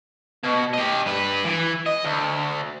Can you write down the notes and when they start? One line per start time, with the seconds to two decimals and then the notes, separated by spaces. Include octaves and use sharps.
0.44 B2
0.74 G4 D#5
1.06 G2 B4
1.45 E3
1.86 D#5
2.04 D2